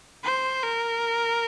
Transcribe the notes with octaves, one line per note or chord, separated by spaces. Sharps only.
C5
A#4